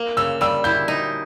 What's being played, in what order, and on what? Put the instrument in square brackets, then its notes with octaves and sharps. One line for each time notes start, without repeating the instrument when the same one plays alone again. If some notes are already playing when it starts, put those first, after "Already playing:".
Already playing: [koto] A#3
[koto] C#3 [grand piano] E6
[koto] G3 [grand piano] E6
[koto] E4 [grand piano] G6
[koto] D#4